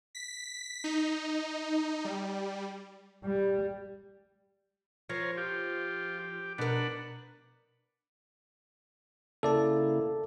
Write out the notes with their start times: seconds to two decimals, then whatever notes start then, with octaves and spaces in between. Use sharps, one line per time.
0.15 B6
0.84 D#4
2.05 G3
3.25 G3
5.10 F3 F4 A#4 C#5
5.37 F4 G4
6.19 G4
6.58 B2 D4 A#4 B4 F#5
9.43 C#3 A#3 E4 A4 D5 A5